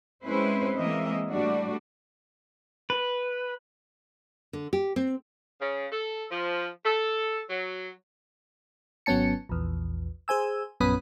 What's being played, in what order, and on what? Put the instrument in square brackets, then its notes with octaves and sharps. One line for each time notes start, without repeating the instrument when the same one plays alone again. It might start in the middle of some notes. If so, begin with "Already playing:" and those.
[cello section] G#3 C4 C#4 E4 B4 C5
E3 G#3 A#3 C4 D#5 E5
A2 G3 A3 D4 F#4 D5
[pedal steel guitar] B4
[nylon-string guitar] D3
G4
C4
[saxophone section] C#3
A4
F3
A4
F#3
[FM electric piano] G#1 F#3 B3 C#4 A5 C#7
A#1 E2
G#4 C5 G#5 E6
A#1 F#2 B3 C#4 B5 D#6